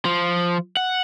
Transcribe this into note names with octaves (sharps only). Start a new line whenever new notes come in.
F3
F#5